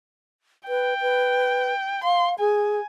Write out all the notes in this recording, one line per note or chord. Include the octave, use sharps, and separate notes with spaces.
B4 G5
B4
F5 C6
G#4 G#5